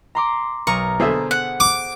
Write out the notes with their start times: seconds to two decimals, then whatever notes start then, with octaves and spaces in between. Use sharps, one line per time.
0.15 A#5 C6 D6
0.67 B1 A#4 A#5 C#6 D#6 D#7
1.00 B2 D3 G#4 A4 C5 E5
1.31 F#5
1.60 D6